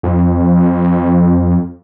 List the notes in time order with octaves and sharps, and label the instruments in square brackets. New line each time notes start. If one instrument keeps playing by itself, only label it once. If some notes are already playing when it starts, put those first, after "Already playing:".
[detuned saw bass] F2